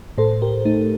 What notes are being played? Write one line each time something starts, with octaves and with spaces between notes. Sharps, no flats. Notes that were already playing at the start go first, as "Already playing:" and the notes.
A2 A4 C5
G4 A#4
A3 D#4